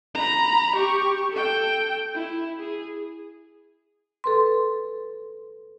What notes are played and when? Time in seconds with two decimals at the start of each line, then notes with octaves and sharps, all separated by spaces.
0.15 A#5 B5
0.76 G4 C#6
1.32 A4 G5
2.15 E4
2.60 G#4
4.24 A4 B4 C6